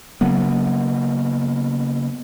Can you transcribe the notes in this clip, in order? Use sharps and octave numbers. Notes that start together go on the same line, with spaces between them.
C#3 F#3 A#3 B3